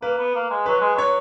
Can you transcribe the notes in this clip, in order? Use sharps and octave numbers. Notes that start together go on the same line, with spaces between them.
A#3 B4
B3
A#3
G#3
F#3 B4
G#3
F#3 C#5